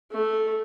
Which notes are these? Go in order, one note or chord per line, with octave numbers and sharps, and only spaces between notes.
A3